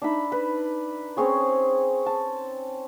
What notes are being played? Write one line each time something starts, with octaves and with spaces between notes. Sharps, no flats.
D4 D#4 E5 B5
B4
C4 C#4 G#4 C#5
A5